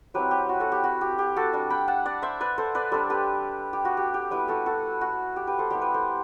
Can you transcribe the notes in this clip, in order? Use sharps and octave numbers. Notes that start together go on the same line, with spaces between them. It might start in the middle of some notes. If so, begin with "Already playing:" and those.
F#3 C4 E4 G4 B4
G4
F#4
F#4 A4
G4
F#4
G4
G4
F#4 A4
G3 D4
G5 B5
F#5 A5
D5 F#5
C5 E5
B4 D5
A4 C5
B4 D5
G3 D4 A4 C5
G4 B4
G4
F#4
G4
G4
G3 B3 E4 G4 B4
F#4 A4
F#4 A4
F#4
G4
G4 B4
A4 C5
G3 B3 E4 G4
G4 B4
A4 C5